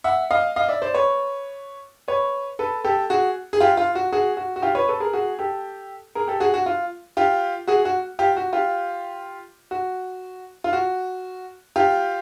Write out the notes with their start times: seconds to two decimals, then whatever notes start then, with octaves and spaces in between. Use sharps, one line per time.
0.04 E5 F#5
0.31 D#5 F5
0.56 D#5 F5
0.68 D5 E5
0.82 C5 D5
0.94 B4 C#5
2.08 B4 C#5
2.59 A4 B4
2.84 G4 A4
3.10 F#4 G#4
3.53 G#4
3.60 F4 G4
3.77 F4
3.95 F#4
4.13 F#4 G#4
4.37 F#4
4.56 F#4
4.62 F4 G4
4.75 B4 C#5
4.88 A4 B4
5.00 G#4 A#4
5.13 F#4 G#4
5.39 G4 A4
6.15 G#4 A#4
6.28 G4 A4
6.40 F#4 G#4
6.54 F#4
6.66 F4
7.17 F4 G4
7.67 F#4 G#4
7.85 F#4
8.19 F4 G4
8.37 F#4
8.53 F4 G4
9.71 F#4
10.64 F4
10.73 F#4
11.76 F4 G4